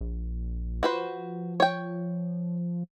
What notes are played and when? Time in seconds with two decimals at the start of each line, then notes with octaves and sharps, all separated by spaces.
0.01 A#1
0.83 F3 F#4 B4 C5
1.60 C#5 G5